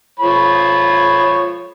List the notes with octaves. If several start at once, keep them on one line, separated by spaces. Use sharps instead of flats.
F3 C#5 B5